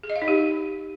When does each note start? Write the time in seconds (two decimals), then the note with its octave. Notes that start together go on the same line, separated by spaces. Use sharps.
0.03 G#4
0.10 D#5
0.16 F5
0.22 D#4
0.28 G4